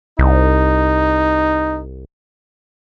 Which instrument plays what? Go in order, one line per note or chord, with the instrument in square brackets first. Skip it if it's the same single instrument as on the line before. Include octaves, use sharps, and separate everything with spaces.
[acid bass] C2 [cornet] D#4